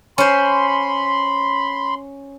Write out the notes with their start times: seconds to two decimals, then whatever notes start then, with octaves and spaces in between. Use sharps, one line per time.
0.18 C#4 C5 B5 C6